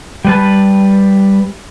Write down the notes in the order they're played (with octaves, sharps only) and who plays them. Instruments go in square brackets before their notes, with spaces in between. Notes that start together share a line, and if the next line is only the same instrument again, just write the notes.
[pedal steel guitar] G3 B4 A5